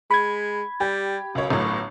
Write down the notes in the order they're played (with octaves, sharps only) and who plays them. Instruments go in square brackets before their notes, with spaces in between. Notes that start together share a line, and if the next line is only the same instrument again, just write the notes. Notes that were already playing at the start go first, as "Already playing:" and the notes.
[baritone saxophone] G#3 [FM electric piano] B5 G#6
[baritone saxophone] G3 [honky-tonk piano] G4
[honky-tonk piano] C#2 C#5 [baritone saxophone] F#2
[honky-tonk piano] G1 A2 F#3